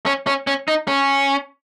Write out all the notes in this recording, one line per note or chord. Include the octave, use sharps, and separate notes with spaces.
C#4
C#4
C#4
D#4
C#4